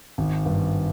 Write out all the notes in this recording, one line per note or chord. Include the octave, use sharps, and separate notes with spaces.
G#1
G2